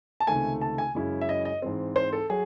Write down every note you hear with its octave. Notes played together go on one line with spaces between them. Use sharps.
A5
C#2 C3 D#3 A3 G#5
A5
G#5
F#2 C#3 G#3 C#4 E4
E5
D#5
D#5
G#2 E3 C4
C5
A4
F#3 G#4